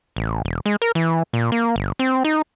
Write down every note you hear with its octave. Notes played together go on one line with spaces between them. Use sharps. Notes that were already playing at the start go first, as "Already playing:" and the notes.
A1
E1
G#3
A#4
E3
A#2
A#3
G1
C4
D#4